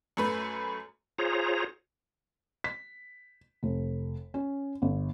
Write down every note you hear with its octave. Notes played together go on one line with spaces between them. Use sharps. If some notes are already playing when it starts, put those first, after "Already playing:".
F#2 A3 B4
F4 G#4 C5 C#5 A#5
B6
F1
C#4
G1